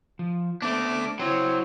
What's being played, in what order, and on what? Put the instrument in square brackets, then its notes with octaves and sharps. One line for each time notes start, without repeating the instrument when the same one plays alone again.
[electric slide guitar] F3
[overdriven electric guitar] A3 D4 [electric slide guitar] B3 C4 [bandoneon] D6
[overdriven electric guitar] F#3 [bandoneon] C4 [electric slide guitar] E4 C5